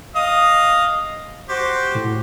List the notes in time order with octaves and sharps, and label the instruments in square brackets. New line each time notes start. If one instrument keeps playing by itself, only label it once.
[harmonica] D#5 F5 D#6
F#4 G4 C5
[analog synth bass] A2